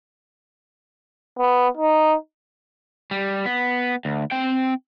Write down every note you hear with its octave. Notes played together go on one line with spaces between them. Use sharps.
B3
D#4
G3
B3
D2
C4 G5